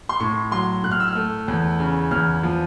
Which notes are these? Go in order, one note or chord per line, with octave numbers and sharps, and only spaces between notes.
C6
A2 C#6
F#3 C6
A2 F#6
F6
E6
F6
A3
E2
C#3
E2 F6
F3